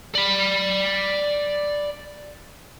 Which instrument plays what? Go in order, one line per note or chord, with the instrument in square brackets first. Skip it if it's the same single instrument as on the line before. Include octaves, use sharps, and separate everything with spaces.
[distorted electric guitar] D5 B5